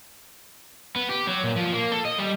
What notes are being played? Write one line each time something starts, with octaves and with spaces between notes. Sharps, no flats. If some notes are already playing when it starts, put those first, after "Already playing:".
B3
G4
F#3
A#2
F3
A#3
A4
D#5
G3